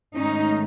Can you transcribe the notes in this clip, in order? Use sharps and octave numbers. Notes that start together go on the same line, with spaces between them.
G#2 D#3 A3 C#4 D#4